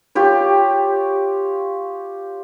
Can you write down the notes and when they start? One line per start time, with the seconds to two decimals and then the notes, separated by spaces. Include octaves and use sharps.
0.15 F4 G4 C#5